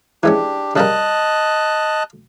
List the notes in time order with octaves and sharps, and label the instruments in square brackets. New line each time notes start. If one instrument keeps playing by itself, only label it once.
[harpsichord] E3 G#3 C#4 [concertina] D4 G4
[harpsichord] C#3 G3 A#4 [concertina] D#5 A5 F#6